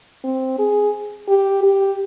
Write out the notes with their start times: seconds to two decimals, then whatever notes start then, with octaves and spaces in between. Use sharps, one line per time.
0.24 C4
0.59 G#4
1.29 G4
1.63 G4